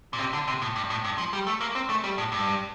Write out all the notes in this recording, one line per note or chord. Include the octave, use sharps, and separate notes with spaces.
A#2
C3
D3
C3
A2
G2
A2
G2
F3
G3
A3
A#3
C4
A3
G3
A2
G2